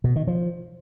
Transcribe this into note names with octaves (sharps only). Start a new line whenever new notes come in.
B2
D#3
F3